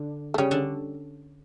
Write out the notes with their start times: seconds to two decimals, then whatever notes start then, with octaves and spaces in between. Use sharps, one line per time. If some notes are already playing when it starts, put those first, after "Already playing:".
Already playing: D3 D4
0.34 A3
0.38 C#3 G3 C#4
0.51 D3 D4